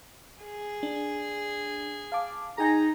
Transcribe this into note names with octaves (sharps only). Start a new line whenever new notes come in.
G#4
D4
F5 A5 D6
D#4 G#4 G5 G#5 A#5